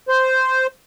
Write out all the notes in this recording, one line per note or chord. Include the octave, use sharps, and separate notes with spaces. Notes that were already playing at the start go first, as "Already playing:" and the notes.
C5